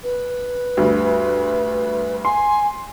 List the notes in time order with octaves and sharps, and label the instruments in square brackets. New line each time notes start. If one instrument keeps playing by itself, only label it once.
[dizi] B4
[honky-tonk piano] D2 G2
[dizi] G#5 [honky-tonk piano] C6